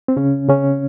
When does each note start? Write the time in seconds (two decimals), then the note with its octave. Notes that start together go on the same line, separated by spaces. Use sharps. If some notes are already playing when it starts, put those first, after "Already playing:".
0.08 C4
0.17 C#3 C#4
0.49 C#3 C#4